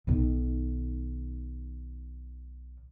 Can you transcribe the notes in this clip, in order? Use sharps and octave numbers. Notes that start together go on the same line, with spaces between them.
B1 D#3